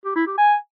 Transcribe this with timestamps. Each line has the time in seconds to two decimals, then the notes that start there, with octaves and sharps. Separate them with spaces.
0.05 G4
0.16 E4
0.27 G4
0.38 G#5